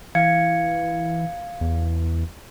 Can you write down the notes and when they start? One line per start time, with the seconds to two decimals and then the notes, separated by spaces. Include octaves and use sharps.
0.15 E3 F5 G#6 C#7
1.61 E2